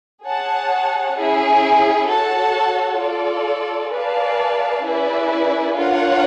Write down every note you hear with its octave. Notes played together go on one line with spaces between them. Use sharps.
G#4 C#5 F#5 A5
C#4 E4 G#4
F#4 A4 C#5 F#5 A5
F4 A4 D5
G#4 B4 D5 F5 A5
C#4 E4 G#4 B4 D5
D4 F4 A#4 C#5 F#5